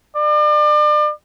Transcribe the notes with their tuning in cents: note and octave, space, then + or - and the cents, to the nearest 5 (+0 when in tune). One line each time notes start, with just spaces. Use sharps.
D5 +35